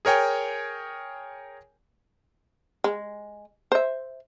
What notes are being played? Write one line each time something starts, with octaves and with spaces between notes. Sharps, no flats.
G#4 A#4 C#5 G5 G#5
G#3
C5 E5